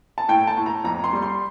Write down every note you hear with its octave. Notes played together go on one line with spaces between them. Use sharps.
A5
A2 G5
A5
A2
A#5
F2 A#5
C6
G3
C6